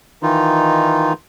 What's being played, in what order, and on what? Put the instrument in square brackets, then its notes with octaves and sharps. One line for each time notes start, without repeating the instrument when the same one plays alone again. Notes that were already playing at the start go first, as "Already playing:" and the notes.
[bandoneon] D#3 E3 D#4 F4